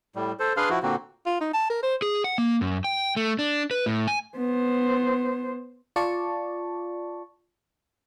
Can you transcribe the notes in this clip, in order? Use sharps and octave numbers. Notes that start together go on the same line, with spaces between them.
A2 G3
A4 C5
D4 G#4 B4 F5 C6 F6
F3 E4 F#4
A#2 D3 A#3 C4 F#4
F4
D#4
A5
A#4
C5
G#4
F#5
A#3
F#2
G5
A3
D4
B4
A2
G#5
B3 C5
F4 D5 A5 C#6